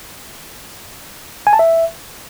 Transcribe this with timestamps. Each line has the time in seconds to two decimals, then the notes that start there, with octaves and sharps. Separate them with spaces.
1.47 G#5
1.53 A5
1.59 E5